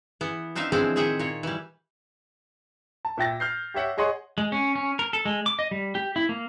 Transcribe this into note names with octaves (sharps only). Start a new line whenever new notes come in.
E3 B3
C4 D4 D#4 E5 F5
D3 E3 F3 G#3 C4 D4
A2 D#3 G#4 E5 F#5 G5
A#2 C#5
E3 G3
A5
A#2 E5 G5 A6 A#6
F6 G6 C7
G4 C#5 E5 F#5
G#4 C#5 D#5 F#5 C6
G#3
C#4
C#4
A#4
A4
G#3
D6
D#5
G3
G4
E4
A#3